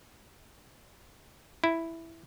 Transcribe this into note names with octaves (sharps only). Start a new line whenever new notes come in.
E4